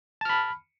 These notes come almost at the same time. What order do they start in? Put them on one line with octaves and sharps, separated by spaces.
A5 F6 B5